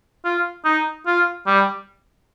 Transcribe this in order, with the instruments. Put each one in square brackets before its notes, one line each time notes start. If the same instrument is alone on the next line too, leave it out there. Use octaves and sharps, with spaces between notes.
[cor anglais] F4
D#4
F4
G3